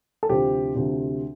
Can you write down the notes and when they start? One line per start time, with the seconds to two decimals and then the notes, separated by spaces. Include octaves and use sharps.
0.23 A4
0.29 D2 C3 F3 G4
0.75 D2 C3 F3